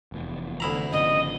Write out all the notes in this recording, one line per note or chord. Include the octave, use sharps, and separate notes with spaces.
F1 E2
D2 E4 A#5
G#1 C#3 F3 D#5